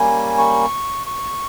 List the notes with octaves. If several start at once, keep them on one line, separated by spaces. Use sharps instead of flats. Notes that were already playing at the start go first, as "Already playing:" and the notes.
Already playing: G3 A#3 C#4 G#5
C#6
C#6